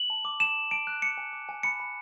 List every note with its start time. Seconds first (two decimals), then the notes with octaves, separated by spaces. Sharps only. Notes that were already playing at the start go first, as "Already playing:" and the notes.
Already playing: F#7
0.10 A5
0.25 D6
0.40 A5 E7
0.56 A5
0.71 A5 D7
0.87 F#6
1.02 D6 C#7
1.18 G#5
1.33 D6
1.49 G#5
1.63 B5 C#7
1.80 B5